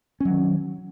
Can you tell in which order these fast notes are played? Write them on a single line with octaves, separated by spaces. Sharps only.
C#4 F#3 D#3